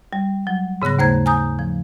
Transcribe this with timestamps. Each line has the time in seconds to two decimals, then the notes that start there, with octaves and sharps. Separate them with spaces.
0.13 G3
0.47 F#3
0.82 G#2 C#3 B3 F#6 A#6
0.99 D#2 A3 C5 A#5 G#6
1.26 G#5 A#5 D#6 G6
1.59 F3